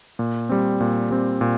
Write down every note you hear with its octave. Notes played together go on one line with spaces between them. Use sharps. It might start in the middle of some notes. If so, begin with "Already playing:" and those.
A#2
G3 C4
A#2
G3 C4
A#2